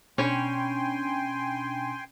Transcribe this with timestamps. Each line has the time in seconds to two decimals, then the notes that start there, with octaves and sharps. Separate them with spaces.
0.18 B2 C#4 D4 C#5 G5 G#5 B5 C6